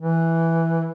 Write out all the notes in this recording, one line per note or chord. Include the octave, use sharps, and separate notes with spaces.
E3